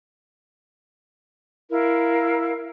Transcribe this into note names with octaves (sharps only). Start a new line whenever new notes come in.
E4 A#4 F5